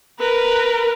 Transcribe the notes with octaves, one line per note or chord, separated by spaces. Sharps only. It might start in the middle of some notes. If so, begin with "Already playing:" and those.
A#4 B4